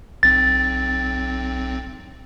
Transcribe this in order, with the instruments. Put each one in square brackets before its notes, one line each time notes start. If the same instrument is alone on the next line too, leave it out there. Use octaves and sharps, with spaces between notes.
[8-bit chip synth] B1 C4 [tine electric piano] A6